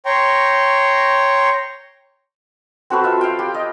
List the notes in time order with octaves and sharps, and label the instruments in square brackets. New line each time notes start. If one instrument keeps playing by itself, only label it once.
[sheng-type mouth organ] C#5 G5 A#5 C6 C#6
[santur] C4 F#4 A4 B4
F4 E5
F5 G5
G4
D#5